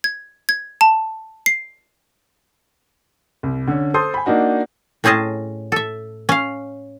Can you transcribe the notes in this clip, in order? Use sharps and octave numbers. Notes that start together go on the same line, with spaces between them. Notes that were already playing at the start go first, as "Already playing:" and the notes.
G#6
G#6
A5
C7
C2
D3 C#4
A4 C5 C6 D#6 G6
G#5 B5
A#3 D4 D#4 F#4
A2 C4 C#4 G#4 D#5 A5
A4 E5
C#4 F5